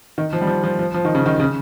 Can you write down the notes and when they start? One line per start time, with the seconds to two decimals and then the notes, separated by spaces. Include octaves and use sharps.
0.18 D#3
0.33 F3
0.41 G3
0.47 F3
0.64 F3
0.79 F3
0.94 F3
1.05 D#3
1.15 C#3
1.26 D#3
1.40 C#3